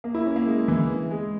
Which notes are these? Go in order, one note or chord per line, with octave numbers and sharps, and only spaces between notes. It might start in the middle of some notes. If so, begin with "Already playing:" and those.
A#3
E4
C#4
A#3
G#3
E3
G#3